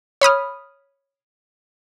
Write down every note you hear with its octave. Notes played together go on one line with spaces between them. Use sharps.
C#5 B5 D#6 F6